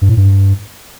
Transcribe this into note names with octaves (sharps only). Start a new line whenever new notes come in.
G2
A2
G2